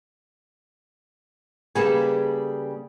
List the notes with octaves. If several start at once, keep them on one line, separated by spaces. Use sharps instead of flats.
C#3 G3 A#3 G#4 A4 B4